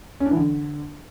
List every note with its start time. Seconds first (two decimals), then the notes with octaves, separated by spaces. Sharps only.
0.20 C#4
0.26 D4
0.31 E3
0.36 D3